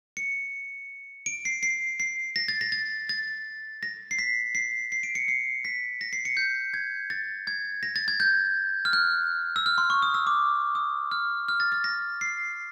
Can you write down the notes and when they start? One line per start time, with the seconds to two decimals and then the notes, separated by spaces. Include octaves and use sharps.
0.17 C#7
1.26 D7
1.45 C7
1.63 C7
2.00 C7
2.36 A#6
2.48 A6
2.61 A#6
2.72 A6
3.09 A6
3.83 A#6
4.11 C7
4.19 B6
4.55 C7
4.92 C7
5.03 D7
5.15 C#7
5.28 C7
5.65 B6
6.01 A#6
6.13 C7
6.25 C#7
6.37 G6
6.74 G#6
7.10 A6
7.47 G#6
7.83 A#6
7.96 A6
8.08 G#6
8.20 G6
8.85 F6
8.93 F#6
9.56 E6
9.66 F6
9.78 C6
9.90 C#6
10.02 D#6
10.14 E6
10.27 D6
10.75 D#6
11.12 F6
11.48 F6
11.60 A6
11.72 A6
11.84 A#6
12.21 C7